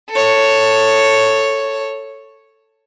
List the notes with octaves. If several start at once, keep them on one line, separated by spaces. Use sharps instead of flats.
A4 C#5